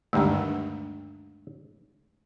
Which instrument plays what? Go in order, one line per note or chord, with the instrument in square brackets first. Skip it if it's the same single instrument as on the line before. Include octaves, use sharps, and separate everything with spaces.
[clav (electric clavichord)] D2 G2 D#3 [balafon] G#3 A3 D4